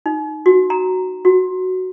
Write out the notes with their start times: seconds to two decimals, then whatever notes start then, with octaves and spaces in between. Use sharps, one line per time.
0.06 D#4
0.46 F#4
0.70 A#5
1.25 F#4